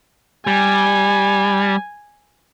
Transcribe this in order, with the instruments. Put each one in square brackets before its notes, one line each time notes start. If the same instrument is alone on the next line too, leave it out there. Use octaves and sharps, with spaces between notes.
[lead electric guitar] G3 [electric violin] G#5